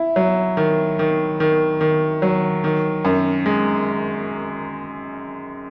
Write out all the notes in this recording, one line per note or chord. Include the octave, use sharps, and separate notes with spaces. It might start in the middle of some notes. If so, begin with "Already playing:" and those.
Already playing: E4
F#3
D#3
D#3
D#3
D#3
F#3
D#3
F#2
G#3